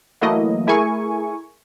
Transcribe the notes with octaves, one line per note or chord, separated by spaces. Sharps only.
E3 F#3 A3 A#3 E4 D#5
A3 E4 G#4 A#4 G#5 C#6